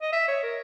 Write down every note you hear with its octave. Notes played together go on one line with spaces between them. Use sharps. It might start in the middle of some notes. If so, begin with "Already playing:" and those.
D#5
E5
C#5
A#4